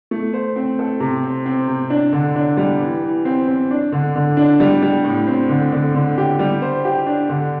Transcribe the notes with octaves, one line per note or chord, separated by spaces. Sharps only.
A3
C5
C4
A4
C3
C4
C4
C3
D4
D3
D4
G3
E3
E3
C4
C4
D4
D3
D3
D4
G3
G3
A2
C4
D3
D3
D3
G4
G3
C5
G4
D4
D3